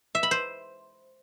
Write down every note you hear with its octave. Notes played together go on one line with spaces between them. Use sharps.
E5
B5
C5